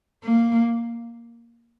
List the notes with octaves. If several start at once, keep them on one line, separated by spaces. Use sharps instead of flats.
A#3